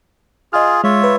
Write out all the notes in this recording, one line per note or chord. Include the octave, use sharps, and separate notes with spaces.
F4 G#4 D#5 F6
G#3 F4 C#5 E5
B4